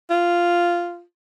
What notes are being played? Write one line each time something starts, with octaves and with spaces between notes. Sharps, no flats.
F4